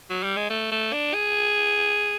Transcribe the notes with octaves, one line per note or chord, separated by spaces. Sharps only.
F#3
G3
G#3
A3
A3
D4
G#4